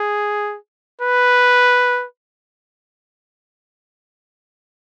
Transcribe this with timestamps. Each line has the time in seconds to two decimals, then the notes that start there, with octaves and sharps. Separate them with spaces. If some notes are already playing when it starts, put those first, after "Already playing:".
Already playing: G#4
1.02 B4